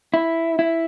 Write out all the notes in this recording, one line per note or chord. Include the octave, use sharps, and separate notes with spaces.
E4
E4